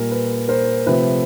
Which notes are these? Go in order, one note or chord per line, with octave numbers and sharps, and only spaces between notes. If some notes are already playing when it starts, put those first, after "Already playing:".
Already playing: A#2 G3 A#4
B4
A#4 C5
C3 F3 A3 B4